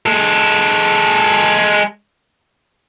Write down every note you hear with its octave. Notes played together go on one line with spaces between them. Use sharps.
G#3 A4